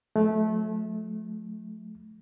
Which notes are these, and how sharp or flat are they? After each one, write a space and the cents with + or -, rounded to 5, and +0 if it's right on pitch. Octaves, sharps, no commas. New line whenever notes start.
F3 +40 A3 -25